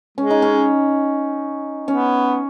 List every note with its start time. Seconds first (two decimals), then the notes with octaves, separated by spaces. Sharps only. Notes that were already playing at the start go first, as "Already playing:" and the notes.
0.18 G#3 C#4
0.31 D#4
0.42 C#4
1.88 B3 C#4